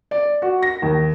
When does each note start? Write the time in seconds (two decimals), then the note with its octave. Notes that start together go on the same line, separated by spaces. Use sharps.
0.11 D5
0.42 F#4
0.63 A#6
0.82 D#2